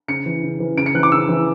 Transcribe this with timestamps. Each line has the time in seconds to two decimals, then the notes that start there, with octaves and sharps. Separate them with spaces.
0.08 C#3 C#7
0.26 E3
0.43 C#3
0.60 E3
0.77 C#3 D7
0.86 C#7
0.94 E3 F#6
1.03 D6
1.12 C#3 E6
1.29 E3